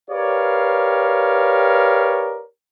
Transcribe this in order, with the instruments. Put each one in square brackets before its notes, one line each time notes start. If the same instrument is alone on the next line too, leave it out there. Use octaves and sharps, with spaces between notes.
[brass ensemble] G4 A#4 B4 C#5 D5 F5